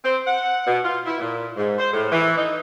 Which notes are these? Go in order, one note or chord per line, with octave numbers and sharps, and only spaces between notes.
C4
F#5
B2
F4
E4
A#2
G#2
C5
A2
E3
D#4